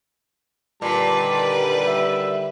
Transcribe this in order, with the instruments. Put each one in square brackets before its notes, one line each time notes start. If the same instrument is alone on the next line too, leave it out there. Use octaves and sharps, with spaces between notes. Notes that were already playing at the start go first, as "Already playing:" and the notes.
[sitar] A#2 [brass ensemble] D3 D#3 G3 [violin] B4 [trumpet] A5
[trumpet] E5